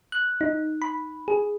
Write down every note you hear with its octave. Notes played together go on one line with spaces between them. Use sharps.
F#6
D#4
B5
G#4